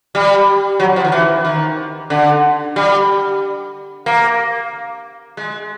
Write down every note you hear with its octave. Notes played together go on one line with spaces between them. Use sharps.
G3
F#3
F3
D#3
E3
D#3
D3
G3
A#3
G#3